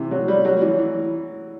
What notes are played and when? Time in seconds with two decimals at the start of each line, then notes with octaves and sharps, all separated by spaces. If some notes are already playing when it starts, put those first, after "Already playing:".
Already playing: C3 E3
0.11 F#3
0.28 G3
0.45 F#3
0.62 E3
0.78 E3